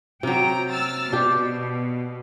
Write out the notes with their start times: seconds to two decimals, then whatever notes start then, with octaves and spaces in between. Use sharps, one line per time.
0.23 C3 F#3 G5 A#5
0.71 E6 F6 A6
1.12 B2 D4 G4